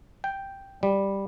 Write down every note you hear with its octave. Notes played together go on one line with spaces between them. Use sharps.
G5
G3